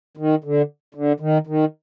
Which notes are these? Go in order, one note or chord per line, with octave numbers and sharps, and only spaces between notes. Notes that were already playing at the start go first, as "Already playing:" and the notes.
D#3
D3
D3
D#3
D#3